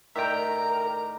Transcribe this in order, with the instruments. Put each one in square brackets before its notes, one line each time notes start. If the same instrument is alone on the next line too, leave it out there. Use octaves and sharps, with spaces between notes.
[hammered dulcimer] A2 D#3 D5 [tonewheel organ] A#4 [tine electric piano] E5 G5 [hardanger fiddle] A#5